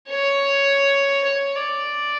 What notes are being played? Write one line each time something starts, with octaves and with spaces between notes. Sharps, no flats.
C#5
C#5
D5